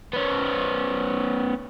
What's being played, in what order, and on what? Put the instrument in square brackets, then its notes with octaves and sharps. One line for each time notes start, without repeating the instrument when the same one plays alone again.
[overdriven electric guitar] B3 C#4